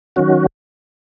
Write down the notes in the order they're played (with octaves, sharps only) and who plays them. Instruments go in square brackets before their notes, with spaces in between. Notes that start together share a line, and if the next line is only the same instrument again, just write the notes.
[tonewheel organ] D#3 F#3 C#4 F#4